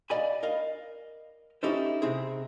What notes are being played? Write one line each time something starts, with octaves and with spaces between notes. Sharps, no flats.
D5 D#5 F5 G#5 B5
A#4 D#5 F5
C#4 D#4 E4 G4 A4 C5
C3 C4 G#4